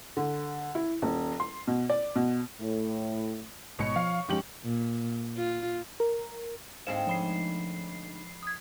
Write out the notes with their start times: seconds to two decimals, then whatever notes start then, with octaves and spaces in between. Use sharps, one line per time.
0.17 D3
0.75 E4
1.02 D#1
1.40 C6
1.67 B2
1.90 D5
2.16 B2
2.60 A2
3.79 A1 G#2 B2 G#3 C#5 C#7
3.96 F3 F5
4.28 F1 G#2 F3 C#4 G4 F#7
4.64 A#2
5.37 F4
6.00 A#4
6.87 D2 G#2 C4 C5 F5 E7
7.07 F3 B5 C7
8.43 D#6 G#6